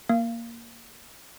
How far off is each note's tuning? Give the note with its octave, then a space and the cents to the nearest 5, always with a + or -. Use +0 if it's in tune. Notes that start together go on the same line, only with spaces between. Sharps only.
A#3 +0 F5 -25